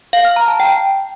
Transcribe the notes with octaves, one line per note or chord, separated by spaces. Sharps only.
F5
F6
A#5
A5
G5